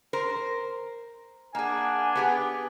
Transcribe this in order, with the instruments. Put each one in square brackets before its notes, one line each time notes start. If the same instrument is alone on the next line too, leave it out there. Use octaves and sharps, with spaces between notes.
[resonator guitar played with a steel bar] A#4 C5
[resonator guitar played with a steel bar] A#3 G#4 [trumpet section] D4 F#5 G#5
[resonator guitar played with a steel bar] B3 G4 G#4